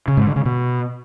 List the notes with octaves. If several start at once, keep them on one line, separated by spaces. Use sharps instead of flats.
C#3
G#2
D3
C#3
B2